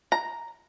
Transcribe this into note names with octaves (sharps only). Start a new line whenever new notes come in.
A#5